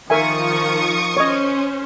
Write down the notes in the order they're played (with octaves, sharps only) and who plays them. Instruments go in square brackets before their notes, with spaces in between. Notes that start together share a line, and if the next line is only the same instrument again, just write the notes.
[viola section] D#3 F3 [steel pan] A#4 E5 G#5 [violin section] C#6 D#6
[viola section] C#4 C5 [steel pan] C#5 D#5